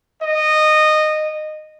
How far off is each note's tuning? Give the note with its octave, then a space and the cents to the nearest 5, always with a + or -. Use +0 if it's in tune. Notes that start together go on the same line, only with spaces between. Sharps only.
D#5 -15